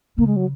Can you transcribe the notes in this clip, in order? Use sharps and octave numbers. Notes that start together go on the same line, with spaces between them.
C#3 A#3
G#3
F#3